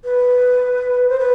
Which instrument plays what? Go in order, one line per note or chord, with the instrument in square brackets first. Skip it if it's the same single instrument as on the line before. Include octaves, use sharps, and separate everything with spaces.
[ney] B4
C5
B4